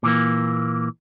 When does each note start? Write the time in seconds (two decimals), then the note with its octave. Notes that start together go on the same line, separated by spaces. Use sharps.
0.03 A#2 E3 A#3